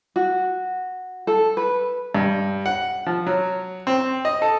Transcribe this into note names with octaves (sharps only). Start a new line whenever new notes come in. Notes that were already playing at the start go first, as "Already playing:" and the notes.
F#4
A4
B4
G2
F#5
F3
F#3
C4
D#5
A4